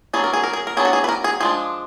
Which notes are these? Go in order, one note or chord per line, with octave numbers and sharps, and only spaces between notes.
F#3 B3 D4 G#4
A#4
G#4
A#4
G#4
A#4
F#3 B3 D4 G#4
F#4
G#4
B4
A#4
G#4
F3 G#3 D4 G#4